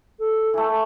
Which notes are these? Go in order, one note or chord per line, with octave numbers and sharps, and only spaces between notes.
A4
E3 A3